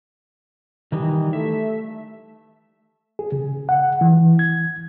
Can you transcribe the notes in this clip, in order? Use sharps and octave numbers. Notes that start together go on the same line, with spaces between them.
D#3 E3 G3 D#4
A3 E5
G#4
C#3
F#5
E3
G#6